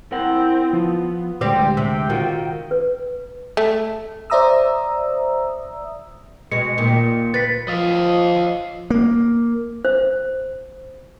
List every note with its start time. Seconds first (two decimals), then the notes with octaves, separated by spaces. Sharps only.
0.12 C4 E4 A#4 C5 F#5
0.73 F3 B3 F4
1.41 D2 G3 G#3 C4 G4
1.77 C3 G5
2.10 D#3 F4 F#4
2.71 B4
3.57 A3
4.30 C5 D5 E5 A#5 D#6 E6
6.52 B2 G#3 C#7
6.78 A#2 D#3
7.34 B4 A6 B6
7.68 F3 D#5 F5
8.90 A#3
9.85 C5